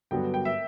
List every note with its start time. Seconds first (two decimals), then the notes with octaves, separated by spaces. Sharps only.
0.11 G2 D3 F#3 B3 G5
0.34 G5
0.45 E5